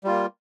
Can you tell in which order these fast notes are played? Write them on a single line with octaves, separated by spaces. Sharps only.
G3 F4 A#3